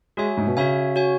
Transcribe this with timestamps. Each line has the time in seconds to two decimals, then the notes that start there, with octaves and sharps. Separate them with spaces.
0.17 G#3 F#4 C#5 E5 G#5
0.37 G#2
0.47 B2
0.57 C#3 F#4 C#5 E5 G#5
0.96 F#4 C#5 G#5